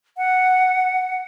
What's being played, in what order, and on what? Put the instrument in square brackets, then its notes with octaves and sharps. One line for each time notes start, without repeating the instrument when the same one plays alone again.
[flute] F#5